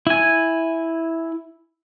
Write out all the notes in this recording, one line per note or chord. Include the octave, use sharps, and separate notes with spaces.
E4 G#5